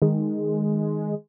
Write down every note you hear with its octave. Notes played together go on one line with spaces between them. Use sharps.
D#3 G#3